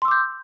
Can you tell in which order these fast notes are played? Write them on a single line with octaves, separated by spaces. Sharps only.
C6 E6 D6 G6